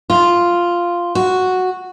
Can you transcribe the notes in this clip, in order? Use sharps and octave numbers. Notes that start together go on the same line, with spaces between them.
F4
F#4